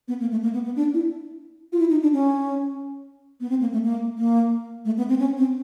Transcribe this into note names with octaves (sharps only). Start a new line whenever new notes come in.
B3
A#3
A3
A#3
B3
B3
D4
E4
F4
E4
D#4
D4
C#4
B3
C4
A#3
A3
A#3
A#3
A3
B3
C4
C#4
C4